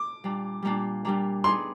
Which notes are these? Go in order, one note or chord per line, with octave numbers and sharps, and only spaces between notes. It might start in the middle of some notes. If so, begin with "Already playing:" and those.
Already playing: D6
A#2 G3 A#3 D4
A#2 G3 A#3 D4
A#2 G3 A#3 D4
B3 D#4 G#4 B4 D5 C6